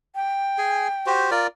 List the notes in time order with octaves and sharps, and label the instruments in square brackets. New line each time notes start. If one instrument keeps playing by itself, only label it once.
[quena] G5
[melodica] G#4 G#5
F#4 G4 C5
F4 A#4 D5